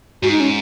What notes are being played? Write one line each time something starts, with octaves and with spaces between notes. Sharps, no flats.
G#2 F#4
D#4
C#4